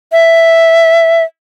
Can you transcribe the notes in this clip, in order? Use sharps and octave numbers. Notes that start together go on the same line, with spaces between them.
E5